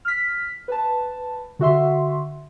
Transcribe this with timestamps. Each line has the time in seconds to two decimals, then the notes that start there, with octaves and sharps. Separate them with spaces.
0.05 F6 B6
0.68 B4 A5
1.59 D3 F#4 E5 C6